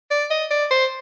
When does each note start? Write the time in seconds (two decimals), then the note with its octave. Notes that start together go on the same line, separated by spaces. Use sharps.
0.11 D5
0.31 D#5
0.51 D5
0.71 C5